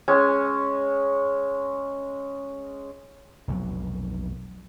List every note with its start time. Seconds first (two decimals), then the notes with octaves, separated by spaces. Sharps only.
0.08 G#3 C#4
3.48 F1 B1 F#3